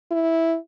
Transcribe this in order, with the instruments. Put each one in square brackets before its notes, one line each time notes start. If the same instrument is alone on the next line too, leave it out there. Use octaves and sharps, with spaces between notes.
[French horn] E4